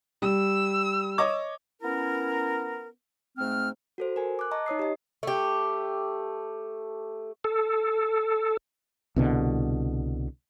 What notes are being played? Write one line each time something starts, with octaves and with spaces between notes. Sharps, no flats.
G3 E6
C#5 D#5 D6
B3 C#4 E4 A#4
G#2 A3 C4 F6
F#4 A4 C5
A#4 G#5
D6 F#6
D#5 A5 A#5 C#6
D#4 C#5 D#6 C7
G4 D#5
A3 G4
A4
C2 B2 D3